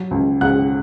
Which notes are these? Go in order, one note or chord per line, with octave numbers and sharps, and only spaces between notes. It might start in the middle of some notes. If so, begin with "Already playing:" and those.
Already playing: F#3
C#2
C#2 F#5 F#6